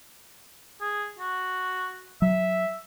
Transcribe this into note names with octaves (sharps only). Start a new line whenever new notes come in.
G#4
F#4
F#3 E5